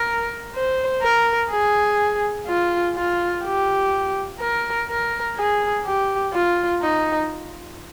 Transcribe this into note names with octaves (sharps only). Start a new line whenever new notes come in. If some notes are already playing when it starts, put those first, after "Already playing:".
Already playing: A#4
C5
A#4
G#4
F4
F4
G4
A#4
A#4
G#4
G4
F4
D#4